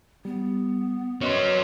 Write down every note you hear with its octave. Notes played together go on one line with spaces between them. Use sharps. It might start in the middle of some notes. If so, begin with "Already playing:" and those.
G3 B3
F#3 C#4 B4 C#5 D#5 C6